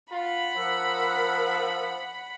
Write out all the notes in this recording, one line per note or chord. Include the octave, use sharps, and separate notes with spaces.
F4 F#5 B5
F3 A#4 E6 F#6